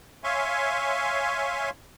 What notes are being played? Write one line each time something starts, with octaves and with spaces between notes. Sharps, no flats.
C#5 E5 F5 G#5 C6 C#6